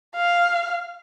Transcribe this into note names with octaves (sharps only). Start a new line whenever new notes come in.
F5